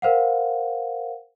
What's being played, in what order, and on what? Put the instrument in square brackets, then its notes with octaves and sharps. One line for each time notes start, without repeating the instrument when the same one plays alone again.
[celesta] A#4 C5 F5 F#5